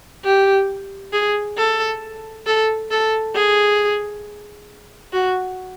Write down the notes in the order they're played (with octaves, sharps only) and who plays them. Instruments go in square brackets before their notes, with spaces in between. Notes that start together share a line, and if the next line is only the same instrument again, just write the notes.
[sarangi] G4
G#4
A4
A4
A4
G#4
F#4